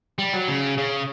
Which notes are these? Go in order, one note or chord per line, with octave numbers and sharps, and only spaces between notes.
G3
F#3
C#3
C#3